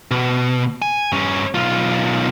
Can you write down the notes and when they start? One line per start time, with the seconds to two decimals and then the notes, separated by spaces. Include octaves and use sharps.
0.11 B2
0.82 G#5
1.12 G2 C#4
1.55 B1 F4